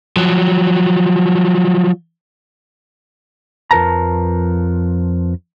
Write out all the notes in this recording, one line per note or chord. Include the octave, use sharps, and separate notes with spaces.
F3 F#3
F2 F3 A#4 B4 A5 A#5